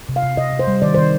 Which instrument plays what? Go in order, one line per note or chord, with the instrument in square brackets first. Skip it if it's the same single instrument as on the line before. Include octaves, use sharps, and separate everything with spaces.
[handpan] C3
F5
C3
C3 D#5
C3
C5
G3
D#3 D5
D#3 C5